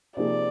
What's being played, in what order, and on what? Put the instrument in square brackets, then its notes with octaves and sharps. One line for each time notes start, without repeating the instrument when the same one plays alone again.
[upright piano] C3 F3 A#3 D#4 G#4 [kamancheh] D5